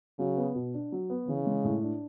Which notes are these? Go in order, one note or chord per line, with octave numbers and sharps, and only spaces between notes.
C#3 F#3
B3
B2
D4
F#3
B3
C#3 E3
G#3
A2
D4